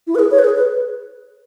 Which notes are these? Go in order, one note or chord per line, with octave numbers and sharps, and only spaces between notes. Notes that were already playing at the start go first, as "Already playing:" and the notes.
E4
B4
G#4
C#5
B4
G#4
B4